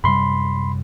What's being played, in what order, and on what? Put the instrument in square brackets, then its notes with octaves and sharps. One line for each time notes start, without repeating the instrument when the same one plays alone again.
[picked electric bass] F#2 C3 G3 [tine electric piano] B5 C6